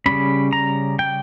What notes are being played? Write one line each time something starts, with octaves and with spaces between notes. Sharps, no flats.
C#3 G3 C#4 B5
A#5
G5